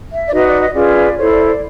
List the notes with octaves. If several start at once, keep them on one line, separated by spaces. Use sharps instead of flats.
E5
D5
D#4 F#4 B4 D#5
D5
D#5
C#4 F4 G#4 B4 D5
E4 A4 C5 C#5
D5
D5